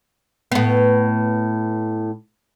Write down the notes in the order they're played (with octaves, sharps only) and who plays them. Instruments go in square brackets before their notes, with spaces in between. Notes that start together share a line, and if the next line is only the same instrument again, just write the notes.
[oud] A2 B3